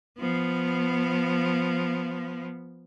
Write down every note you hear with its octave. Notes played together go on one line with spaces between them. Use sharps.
F3 B3